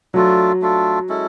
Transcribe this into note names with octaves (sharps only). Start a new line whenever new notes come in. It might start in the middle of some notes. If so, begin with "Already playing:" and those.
F#3 A3 D4 F4 A4
A3 D4 F4 A4
G#3 C#4 E4 A4